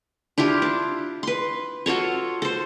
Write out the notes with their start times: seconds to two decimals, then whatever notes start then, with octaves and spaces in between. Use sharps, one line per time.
0.38 D4 E4 F4 G4
0.62 D4
1.23 B4 C6
1.86 F4 F#4 A4 C#5
2.42 A4 C5